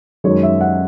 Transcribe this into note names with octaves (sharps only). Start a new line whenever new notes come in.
F#2 D#3 G#3 C#5
E5
F#5